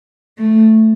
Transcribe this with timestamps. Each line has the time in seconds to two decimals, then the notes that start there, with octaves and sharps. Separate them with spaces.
0.38 A3